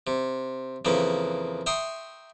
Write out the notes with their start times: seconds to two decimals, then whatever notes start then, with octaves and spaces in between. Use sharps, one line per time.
0.07 C3
0.85 F2 C#3 E3 A#3
1.66 E5 G5 A#5 C6 C#6 D#6